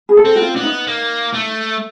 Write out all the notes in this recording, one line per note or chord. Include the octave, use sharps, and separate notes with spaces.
G#4
A4
C4
F#4
F4
B3 D4
D#4
A#3
A3